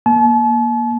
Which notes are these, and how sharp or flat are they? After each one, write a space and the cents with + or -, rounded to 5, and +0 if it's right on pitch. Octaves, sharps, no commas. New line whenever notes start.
A#3 +20 A5 -40